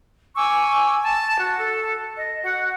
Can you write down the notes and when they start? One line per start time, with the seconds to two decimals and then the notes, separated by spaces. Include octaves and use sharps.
0.35 G#5 C#6 D6 E6
1.04 A5
1.40 F#4
1.57 A4
2.15 D#5
2.43 F#4 F#5